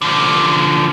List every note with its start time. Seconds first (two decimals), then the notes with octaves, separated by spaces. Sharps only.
0.02 D3 F3